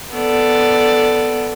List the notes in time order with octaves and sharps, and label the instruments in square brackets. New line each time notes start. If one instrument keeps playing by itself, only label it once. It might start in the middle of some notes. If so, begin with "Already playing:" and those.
[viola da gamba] B3 A4 D5